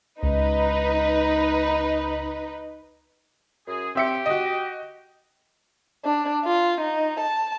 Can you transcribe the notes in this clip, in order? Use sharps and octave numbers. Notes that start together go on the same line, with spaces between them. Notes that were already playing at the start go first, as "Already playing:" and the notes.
C#2 D#4 B4
F#2 G#4
C4 G4 E5 C#7
F#4 D#5
D4
F4
D#4
A5